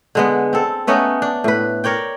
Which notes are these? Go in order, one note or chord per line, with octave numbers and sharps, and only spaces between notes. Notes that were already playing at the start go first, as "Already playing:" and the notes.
D3 G#3 B3
C4 A4
A3 B3 C#4 D#4
D4
A2 B4
A#4 C#5 D5 G5